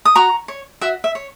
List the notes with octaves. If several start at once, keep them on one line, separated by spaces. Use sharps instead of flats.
D#6
F#4 A#5 C#6
C#5
F#4 E5
E5
C#5